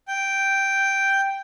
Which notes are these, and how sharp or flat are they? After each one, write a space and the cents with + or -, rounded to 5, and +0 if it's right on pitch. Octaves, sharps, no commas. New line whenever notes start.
G5 +0